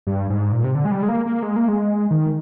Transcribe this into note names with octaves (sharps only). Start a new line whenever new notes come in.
G2
G#2
A#2
C3
D3
G#3
G3
G#3
A#3
A#3
G#3
A#3
G#3
D#3